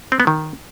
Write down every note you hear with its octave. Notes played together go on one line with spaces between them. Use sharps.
C4
B3
D#3